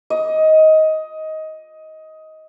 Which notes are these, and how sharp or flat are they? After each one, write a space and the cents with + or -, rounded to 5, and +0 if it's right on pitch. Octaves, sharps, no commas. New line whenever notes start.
D#5 +15